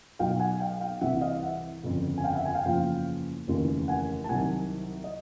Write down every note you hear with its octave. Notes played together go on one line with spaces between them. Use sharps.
B1 B2 F#3 F5 G5
F#5 G#5
F5 G5
F5 G5
C2 C3 E3 E5 F#5
F#5
D#5 F5
E5 F#5
G1 F2 C#3
G#5
F5 G5
E5 F#5
F#5 G#5
F5 G5
F#1 E2 C#3 F3 F5 G5
F1 D#2 C#3 E3
F#5 G#5
A5
C2 C3 D#3 F#3 F#5 G#5
D#5